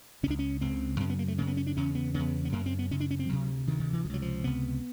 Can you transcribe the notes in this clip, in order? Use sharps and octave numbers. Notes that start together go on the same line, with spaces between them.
C#2 C#3 C#4 D4
C#4
C#2 C#3 C4
F#2 C#3 C4
B3
A#3
A3
F#2 C#3 A#3
B3
C#4
D4
E2 C#3 C#4
B3
E2 C#3 B3
B3
F#2 C#3 A#3
C4
B3
F#2 C#3 C#4
D4
C#4
C4
D2 C3 F#3
D2 C3 D#3
D#3
E3
C#2 C3 F3 F#3
F3
C#2 C3 B3